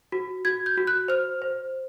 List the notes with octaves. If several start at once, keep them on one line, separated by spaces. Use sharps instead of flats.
F#4
F#4 G#6
G6
F#4
F#6
C5 F6
C5